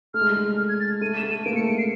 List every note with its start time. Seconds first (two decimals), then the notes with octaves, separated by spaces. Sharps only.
0.14 A3 F6
0.21 G#3
0.29 G3
0.37 G#3
0.58 F6
0.69 G#6
0.80 A6
1.01 A3 D#7
1.17 E7
1.23 A3
1.31 D#7
1.45 A#3 D7
1.53 A3
1.56 C#7
1.61 G#3
1.67 A3 D7
1.78 C7